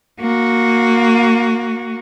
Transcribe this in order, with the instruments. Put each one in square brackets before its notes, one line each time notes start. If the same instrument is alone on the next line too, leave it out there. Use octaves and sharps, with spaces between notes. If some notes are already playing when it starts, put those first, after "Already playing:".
[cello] A#3 F#4